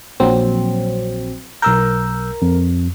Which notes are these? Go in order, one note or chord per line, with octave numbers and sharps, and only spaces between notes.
A#1 F#3 C4
B1 A#4 E6 G6
F2